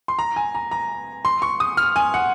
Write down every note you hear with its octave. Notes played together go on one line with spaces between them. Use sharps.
C6
A#5
G#5
A#5
A#5
C6
C#6
D#6
F6
G#5
F#5